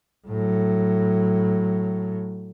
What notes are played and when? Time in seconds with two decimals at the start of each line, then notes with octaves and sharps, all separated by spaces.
0.27 A2 F#3